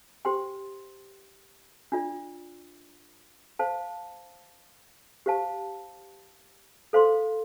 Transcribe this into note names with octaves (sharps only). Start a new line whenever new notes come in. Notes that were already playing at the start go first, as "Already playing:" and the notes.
G4 C5 G5 C6
D4 F4 D5
C5 F5 A5
G4 C5 F5 A5
A4 C5 F5 C6